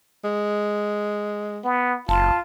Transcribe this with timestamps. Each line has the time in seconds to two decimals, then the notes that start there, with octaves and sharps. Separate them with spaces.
0.24 G#3
1.65 B3
2.09 F#1 F4 A5